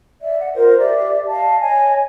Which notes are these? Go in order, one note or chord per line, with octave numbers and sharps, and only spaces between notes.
D5 E5
F#5
F4 A#4 C5
G4 D5 E5
D#5 F5 A5
C#5 D#5 G#5